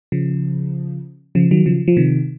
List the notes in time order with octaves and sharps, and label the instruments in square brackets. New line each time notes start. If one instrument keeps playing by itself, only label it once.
[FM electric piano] C#3 F3
C#3 F3
D#3 F#3
C#3 F3
F3
C3 D#3